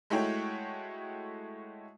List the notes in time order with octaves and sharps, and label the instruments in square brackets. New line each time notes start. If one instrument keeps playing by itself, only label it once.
[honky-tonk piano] G#3 A3 E4 F#4 C#5 G5